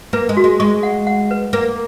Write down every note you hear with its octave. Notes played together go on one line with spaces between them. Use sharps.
A#3 B4
G#3
F#4
G#3
G#3 C#6
F#5
F#5
B4
A#3 B4